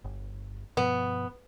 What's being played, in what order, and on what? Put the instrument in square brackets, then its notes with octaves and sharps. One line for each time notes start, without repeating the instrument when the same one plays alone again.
[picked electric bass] G1
[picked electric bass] G2 B2 F3 [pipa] B3